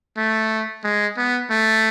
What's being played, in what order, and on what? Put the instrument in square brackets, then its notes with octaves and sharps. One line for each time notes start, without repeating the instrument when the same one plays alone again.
[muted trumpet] A3
G#3
B3
A3